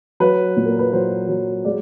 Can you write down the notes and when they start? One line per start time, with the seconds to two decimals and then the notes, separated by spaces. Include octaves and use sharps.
0.20 F#3 B4
0.57 A#2
0.65 A#4
0.79 B4
0.92 F#3 C5
1.29 F#3
1.65 G#3 D5